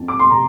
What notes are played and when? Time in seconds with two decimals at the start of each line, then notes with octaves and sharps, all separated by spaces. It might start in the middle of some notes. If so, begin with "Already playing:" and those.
Already playing: F2 A5
0.08 D6
0.19 C6
0.30 C3 A#5